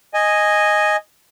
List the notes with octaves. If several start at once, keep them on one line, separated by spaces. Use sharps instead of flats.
D#5 G#5